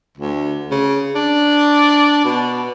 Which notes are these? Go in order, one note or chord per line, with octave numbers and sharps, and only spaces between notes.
D2
C#3
D4
B2